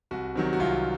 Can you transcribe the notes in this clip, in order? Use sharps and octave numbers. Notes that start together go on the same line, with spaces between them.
C2 F#4
C3 D#3 F#3
F#4
C2 F4